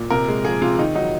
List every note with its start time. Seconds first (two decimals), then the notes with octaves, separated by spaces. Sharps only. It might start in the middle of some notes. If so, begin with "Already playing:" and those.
Already playing: A#2
0.10 C3 A#4
0.28 G#3
0.44 F3 G#4
0.61 C3 F4
0.78 D#3 D#4
0.95 F#3 D#4